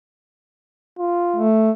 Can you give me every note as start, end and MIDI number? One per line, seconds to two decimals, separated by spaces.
0.99 1.46 65
1.36 1.71 57